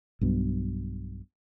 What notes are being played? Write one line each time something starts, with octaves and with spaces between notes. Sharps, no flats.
B1 G2 B2